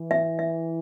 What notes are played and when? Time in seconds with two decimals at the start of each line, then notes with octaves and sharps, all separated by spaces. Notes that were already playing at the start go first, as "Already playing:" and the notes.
Already playing: E3
0.11 E5
0.39 E5